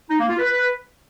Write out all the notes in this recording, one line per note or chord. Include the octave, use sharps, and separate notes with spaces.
D#4
A#3
F4
B4